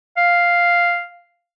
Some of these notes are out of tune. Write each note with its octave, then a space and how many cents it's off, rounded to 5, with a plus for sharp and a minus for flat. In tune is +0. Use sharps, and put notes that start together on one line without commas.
F5 +0